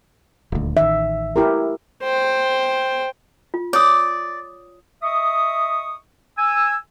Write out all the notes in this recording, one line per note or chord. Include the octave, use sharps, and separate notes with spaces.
D#1 D2
A1 D#3 E5
E4 G4 A#4
C5 G5
F4
C#5 D5 D#6
D#5 E5 C#6 D#6
G#5 E6